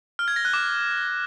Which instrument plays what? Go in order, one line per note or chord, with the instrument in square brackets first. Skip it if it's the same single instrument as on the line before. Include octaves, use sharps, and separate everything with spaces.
[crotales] F6
G#6
A#6
F#6
D6